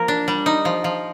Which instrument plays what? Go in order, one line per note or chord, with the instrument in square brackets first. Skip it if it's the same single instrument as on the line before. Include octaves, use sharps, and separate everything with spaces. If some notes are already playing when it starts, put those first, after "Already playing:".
Already playing: [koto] F3 A#3 A#4
D4
G3
D#4
F3
F3